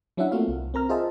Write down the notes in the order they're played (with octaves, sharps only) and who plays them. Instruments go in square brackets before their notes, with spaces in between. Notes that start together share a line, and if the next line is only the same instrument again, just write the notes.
[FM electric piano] F#3 C#4 D4 E4 E5 F#5
A3 A#3 C4 F4 F#4 F5
C2
C4 A#4 A#5 F6
F4 G#4 C5 D#5 E5 A5